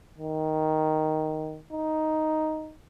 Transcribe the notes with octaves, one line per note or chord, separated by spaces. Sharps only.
D#3
D#4